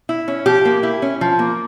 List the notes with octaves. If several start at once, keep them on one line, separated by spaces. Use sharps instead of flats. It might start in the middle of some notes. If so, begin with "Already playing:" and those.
E4
C#4
F3 G4
A#3
E4
C#4
F3
A#3